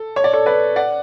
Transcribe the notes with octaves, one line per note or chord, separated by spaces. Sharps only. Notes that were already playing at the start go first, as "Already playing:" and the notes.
Already playing: A4
C#5
D5
A4 C#5
B4 D5
D5 F#5